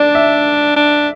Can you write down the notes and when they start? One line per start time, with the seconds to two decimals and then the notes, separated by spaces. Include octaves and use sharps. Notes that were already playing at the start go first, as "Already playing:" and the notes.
Already playing: D4 D5
0.15 E5
0.76 D4